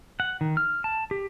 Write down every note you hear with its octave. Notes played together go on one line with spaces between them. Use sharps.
F#5
D#3
F6
A5
G4